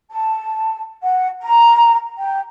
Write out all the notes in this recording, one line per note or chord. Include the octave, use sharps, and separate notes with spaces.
A5
F#5
A#5
G5